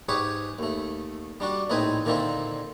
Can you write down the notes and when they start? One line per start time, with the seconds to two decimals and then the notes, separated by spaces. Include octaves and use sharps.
0.09 G#2 G4 G#4 B4 C#5
0.59 D#2 A3
1.40 G3 D4 F#4
1.70 A#1 A2 C4 D#4 B4 G#5
2.05 A#2 D3 D#3 A#3 C4 E4